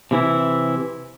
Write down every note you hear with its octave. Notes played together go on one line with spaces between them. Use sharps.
C3 E3 E4